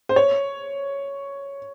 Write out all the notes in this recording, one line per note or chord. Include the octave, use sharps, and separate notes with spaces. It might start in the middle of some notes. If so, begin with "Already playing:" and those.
C5
C#5